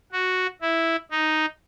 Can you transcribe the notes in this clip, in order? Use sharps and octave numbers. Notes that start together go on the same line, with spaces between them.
F#4
E4
D#4